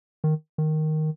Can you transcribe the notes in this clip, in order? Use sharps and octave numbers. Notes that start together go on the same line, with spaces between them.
D#3
D#3